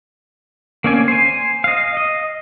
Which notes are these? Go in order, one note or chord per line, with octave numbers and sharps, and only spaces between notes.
A#3 C4 C#4 D5 G#5
C5 G#5
D#5 F5
D#5